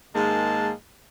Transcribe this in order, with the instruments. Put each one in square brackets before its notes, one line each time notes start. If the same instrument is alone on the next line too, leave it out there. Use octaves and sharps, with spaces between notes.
[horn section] G#2 D#3 G#3 A#3 A5